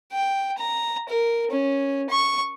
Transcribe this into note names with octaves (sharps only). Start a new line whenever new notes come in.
G5
A#5
A#4
C#4
C#6